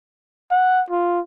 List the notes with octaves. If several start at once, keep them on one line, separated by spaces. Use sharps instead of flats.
F#5
F4